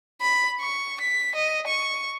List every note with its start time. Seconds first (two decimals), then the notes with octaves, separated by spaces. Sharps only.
0.21 B5
0.61 C#6
1.01 B6
1.35 D#5
1.67 C#6